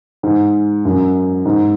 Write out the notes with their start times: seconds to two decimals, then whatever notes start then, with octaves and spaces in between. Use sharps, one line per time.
0.23 G#2
0.85 F#2
1.45 G#2